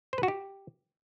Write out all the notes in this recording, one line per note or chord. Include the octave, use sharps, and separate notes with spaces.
C5
B4
F#4
G4